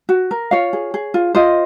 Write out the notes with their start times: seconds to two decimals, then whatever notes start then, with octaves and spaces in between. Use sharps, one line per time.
0.09 F#4
0.31 A#4
0.51 F4 C#5 F5
0.73 G#4
0.94 G#4
1.14 F4
1.35 F4 C5 D#5